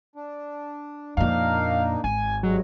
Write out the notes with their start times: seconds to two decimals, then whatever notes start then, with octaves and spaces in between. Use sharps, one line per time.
0.16 D4
1.17 F2 A#2 A#3 D4 D#4 F5
2.04 G#1 G#5
2.43 G2 F#3 G#3